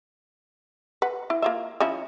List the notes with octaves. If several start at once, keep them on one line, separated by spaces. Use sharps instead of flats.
B4 F#5
E4
A#3 F4 E5
F3 C#4 E4